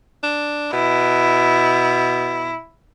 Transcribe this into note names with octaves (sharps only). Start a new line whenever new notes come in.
D4
B2 E4